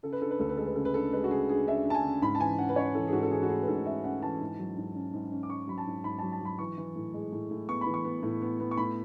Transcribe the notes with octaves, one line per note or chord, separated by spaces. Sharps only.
C#3 A4
B4
D4 A4
B4
D2 A4
B4
G#3 A4
B4
C#3 A4
B4
D4 A4
G#3 B4
F#4
C#3 G#4
D4 G#4
D4 E5
D4 A5
G#5
C#3
G#2 B5
A5
E3 G#5
C#4 F#5
B4
C#4 C#5
E3 A4
G#4
G#2 F#4
A4
E3 G#4
F#4
A3 G#4
B4
G#2 A4
C#4 E5
C#4 F#5
E3 A5
G#2
F#3
G#2
C#4
G#2
C#4
D6
C#4 C#6
F#3 B5
A5
G#2
G#2 B5
F#3 A5
A5
F#3 B5
E3 C#6
E3
A2
G#3
A2
A2
B3 C#6
B5
E3
C#6
B3
A2
B3
B3
C#6
A2 B5